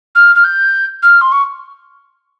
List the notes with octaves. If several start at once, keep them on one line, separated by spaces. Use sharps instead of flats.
F6
F6
G6
F6
C6
C#6